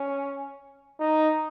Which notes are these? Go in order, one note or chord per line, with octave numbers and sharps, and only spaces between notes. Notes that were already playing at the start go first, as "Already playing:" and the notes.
Already playing: C#4
D#4